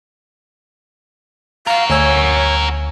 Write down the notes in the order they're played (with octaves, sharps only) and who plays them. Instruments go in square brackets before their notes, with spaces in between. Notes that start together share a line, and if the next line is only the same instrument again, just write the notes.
[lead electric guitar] F#4 A#4 [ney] F5
[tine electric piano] D2 G#5 E6 [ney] C#5